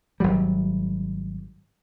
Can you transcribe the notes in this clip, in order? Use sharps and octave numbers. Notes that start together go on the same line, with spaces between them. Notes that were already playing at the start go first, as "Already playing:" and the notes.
G#1 F#3 G3